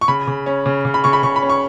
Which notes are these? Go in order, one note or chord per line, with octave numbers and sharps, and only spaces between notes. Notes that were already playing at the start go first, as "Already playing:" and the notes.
C#6
C#3 B5
C#3
C#4
C#3
C#3
B5
C#3 C#6
B5
C#3 C#6
B5
C#4
C#6